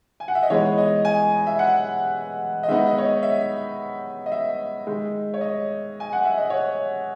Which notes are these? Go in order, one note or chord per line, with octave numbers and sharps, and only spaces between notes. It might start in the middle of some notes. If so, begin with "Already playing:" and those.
G#5
F#5
E5
D#5
E3 G#3 B3 D#4 C#5
D#5
G#5
E5
F#5
D#5
D#3 G#3 B3 D#4 E5
D#5
C#5
D#5
E5
D#5
E5
D#3 G#3 D#4
C#5
D#5
G#5
F#5
E5
D#5
C#5